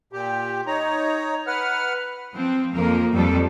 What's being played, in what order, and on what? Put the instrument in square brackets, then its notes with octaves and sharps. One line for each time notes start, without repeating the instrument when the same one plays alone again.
[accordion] A#2 G4
D#4 C#5 A#5
B4 F#5 F6
[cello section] F3 C4
F2 F3 A#3 A#4
F2 G3 A4